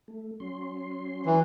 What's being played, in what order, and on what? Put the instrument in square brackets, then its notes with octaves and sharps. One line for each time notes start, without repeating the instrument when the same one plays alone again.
[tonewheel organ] A3
F#3 C#4 C6
[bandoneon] E3